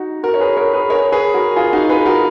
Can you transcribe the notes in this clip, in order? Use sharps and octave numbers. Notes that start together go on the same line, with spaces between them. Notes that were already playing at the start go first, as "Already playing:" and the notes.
Already playing: D#4 F#4
F#4 A#4
C#5
G#4 B4
A#4 C#5
G#4 B4
A#4 C#5
G#4 B4
F#4 A#4
F4 G#4
D#4 F#4
G#4 B4
F#4 A#4